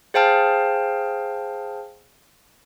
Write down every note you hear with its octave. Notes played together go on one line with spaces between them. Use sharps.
G#4 C5 F5 G5 A5 F6